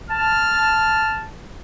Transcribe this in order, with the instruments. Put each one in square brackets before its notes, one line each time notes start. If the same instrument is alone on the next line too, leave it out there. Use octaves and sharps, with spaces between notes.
[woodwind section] A5 [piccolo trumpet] F6